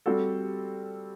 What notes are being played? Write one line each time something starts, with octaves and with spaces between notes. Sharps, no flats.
G3 C4 F#4 A4